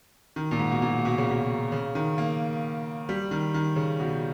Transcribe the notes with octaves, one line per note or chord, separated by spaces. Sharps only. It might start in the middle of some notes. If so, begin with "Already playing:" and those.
D#3
A#2
G#2
B2
A#2
B2
C#3
B2
C#3
D#3
A#3
G3
D#3
D#3
C#3
B2